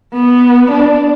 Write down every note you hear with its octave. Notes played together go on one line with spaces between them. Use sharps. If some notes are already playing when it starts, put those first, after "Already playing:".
B3
D4